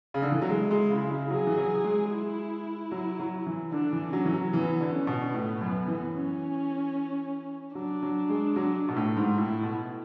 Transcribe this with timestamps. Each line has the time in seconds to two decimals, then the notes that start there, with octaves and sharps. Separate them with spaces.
0.14 C#3
0.22 D3
0.32 E3
0.42 F#3
0.49 G#3 E4
0.71 G#3
0.90 C#3
1.10 C#3
1.30 F#3 G#4
1.47 E3
1.57 F#3
1.84 G#3
2.11 E4
2.91 F#3
3.19 F#3
3.46 E3
3.72 D3 D4
3.93 E3
4.13 F#3 C#4
4.25 E3
4.33 F#3
4.53 E3 B3
4.81 D3
4.94 C#4
5.07 B2
5.34 A2 B3
5.61 F#2
5.88 E3
6.14 C#4
7.75 F#3 D4
8.02 F#3
8.29 G#3
8.56 F#3
8.88 B2
8.96 A2
9.17 G#2
9.37 A2 E4
9.63 B2